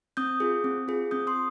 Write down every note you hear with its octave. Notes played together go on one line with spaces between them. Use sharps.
C4 D#6 G6
F4 G#4
C4
F4 G#4
C4 D#6 G6
C6 D#6